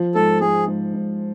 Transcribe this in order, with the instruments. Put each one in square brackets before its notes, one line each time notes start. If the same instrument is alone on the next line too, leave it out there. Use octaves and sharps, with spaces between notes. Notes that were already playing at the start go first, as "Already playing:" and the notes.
Already playing: [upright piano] F3
[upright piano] G#2 [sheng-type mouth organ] A4
[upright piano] G#2 [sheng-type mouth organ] G#4
[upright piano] G#2
G#2